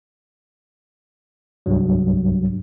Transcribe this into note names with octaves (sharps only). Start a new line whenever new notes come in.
C2 G2 F#3